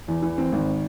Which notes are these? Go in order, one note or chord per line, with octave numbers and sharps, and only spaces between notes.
E2
E3
C4
G#1